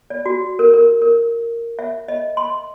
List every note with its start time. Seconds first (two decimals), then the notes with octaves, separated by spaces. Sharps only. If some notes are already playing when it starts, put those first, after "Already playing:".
0.10 D5
0.26 F#4
0.59 A#4
0.74 A#4
1.02 A#4
1.79 E5
2.08 D#5
2.37 C6